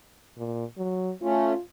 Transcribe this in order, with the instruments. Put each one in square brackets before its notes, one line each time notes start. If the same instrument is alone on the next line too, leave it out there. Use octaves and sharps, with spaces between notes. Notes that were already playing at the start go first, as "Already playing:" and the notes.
[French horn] A#2
F#3
[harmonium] A3 C#4 [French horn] F4